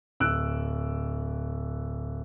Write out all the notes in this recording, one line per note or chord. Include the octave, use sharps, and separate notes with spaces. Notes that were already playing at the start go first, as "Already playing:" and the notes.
D1 E6 F#6 D7